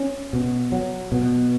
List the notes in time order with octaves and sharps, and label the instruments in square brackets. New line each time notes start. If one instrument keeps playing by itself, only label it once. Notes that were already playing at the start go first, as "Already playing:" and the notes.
Already playing: [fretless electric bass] C#4
B2
F#3
B2